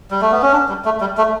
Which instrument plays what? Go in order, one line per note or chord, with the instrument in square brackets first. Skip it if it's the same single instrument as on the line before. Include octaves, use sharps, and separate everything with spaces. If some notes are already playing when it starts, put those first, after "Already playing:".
[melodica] G3
A3
B3
C#4
D4
G3
A3
G3
A3